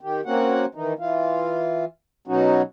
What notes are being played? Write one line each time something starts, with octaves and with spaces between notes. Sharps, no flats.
D#3 G4
A#3 C4 C#4 F#4 F#5
D#3 E3 D#4
E3 F4
B2 F#3 C#4 D#4 F#4